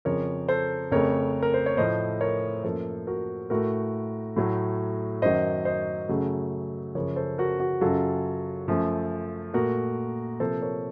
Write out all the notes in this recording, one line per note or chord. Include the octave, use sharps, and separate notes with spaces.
F2 C#3 F3 A#4 C#5
A4 C5
F2 C#3 A3 A#4 C#5
A#4
C5
C#5
A2 F3 A3 C5 D#5
A#4 C#5
F#2 F3 A#3 A4 C5
F#4 A#4
A2 A3 F#4 A#4
A2 F#3 A3
F#2 D#3 F#3 C5 D#5
C5 D#5
F#2 C#3 F#3 A3
F#2 C#3 F3 A#4 C#5
A4 C5
F#4 A#4
F#4
F#2 C#3 F#3 F4 A4
F#2 F3 A3
A#2 A3 F#4 A#4
C3 F3 A#3 A4 C5
A#4 C#5